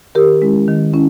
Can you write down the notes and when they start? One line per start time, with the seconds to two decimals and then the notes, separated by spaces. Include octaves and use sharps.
0.15 D#3 G4 A#4
0.41 G#3 C#4 E4
0.68 D#3
0.93 C#4 E4